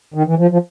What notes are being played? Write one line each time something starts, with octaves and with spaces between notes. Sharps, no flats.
D#3
E3
F3
F3